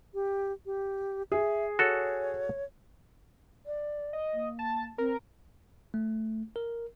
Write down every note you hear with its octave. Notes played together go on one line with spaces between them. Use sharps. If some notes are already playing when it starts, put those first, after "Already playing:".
G4
G4
G#4 E5
F#4 A4 C#5
D5
D#5
A#3
A5
C4 A#4
A3
A#4